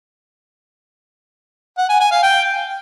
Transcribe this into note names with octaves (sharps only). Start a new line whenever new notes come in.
F#5
G#5
G#5
F5
G5